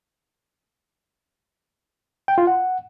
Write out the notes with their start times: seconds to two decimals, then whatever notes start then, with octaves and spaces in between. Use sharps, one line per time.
2.28 G5
2.38 F4
2.47 F#5